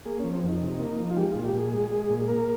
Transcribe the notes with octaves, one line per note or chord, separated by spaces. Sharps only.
A#3 G#4
F3 C#4
C4
F2 D#4
C3
A#3
F3
F4
G#3 G4
A#2 F4
G4
A#2 G#4
G#3
G#3
A#2
A#3 A#4